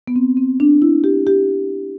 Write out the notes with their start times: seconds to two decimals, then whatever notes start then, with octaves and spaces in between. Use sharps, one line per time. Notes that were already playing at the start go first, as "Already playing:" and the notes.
0.08 B3
0.16 C4
0.37 C4
0.60 D4
0.82 E4
1.04 G4
1.27 G4